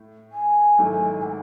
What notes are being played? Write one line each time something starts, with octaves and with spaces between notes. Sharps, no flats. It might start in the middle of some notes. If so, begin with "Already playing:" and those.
Already playing: A2
G#5
G#1 G#2 F#3 A3 E4
G#5
F#5